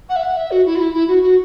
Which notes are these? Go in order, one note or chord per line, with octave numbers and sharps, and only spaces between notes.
F#5
E5
F#5
E5
F#4
E4
F#4
E4
E4
F#4
F#4